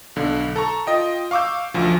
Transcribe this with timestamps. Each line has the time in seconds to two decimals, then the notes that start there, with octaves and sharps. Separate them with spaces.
0.16 B1 D3
0.56 A4 A#5 C#6
0.87 F4 D#5 G5
1.31 F5 C#6 D6 E6 G6
1.74 A1 D2 F3